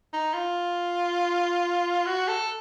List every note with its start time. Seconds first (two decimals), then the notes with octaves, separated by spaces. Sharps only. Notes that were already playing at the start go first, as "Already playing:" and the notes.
0.13 D#4
0.34 F4
2.06 F#4
2.28 A4